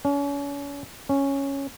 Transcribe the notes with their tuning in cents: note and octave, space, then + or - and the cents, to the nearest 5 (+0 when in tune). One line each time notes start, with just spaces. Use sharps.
C#4 +35
C#4 -5